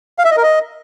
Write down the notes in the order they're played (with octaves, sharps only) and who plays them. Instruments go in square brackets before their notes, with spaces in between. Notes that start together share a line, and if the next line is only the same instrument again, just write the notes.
[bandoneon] F5
E5
D#5
A#4
D#5